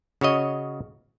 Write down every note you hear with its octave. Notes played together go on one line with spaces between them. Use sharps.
C#3 F#4 C#5 D#5